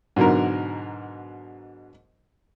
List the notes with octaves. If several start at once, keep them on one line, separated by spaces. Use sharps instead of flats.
G#2 B2 D3 F#3 A#4